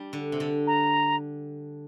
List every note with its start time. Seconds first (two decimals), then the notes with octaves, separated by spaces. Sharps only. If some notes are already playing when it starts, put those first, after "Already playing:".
Already playing: G3 D4
0.13 D3
0.32 C3
0.40 D3
0.67 A#5